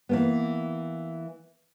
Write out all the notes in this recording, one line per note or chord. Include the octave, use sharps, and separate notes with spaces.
E3 A#3 B3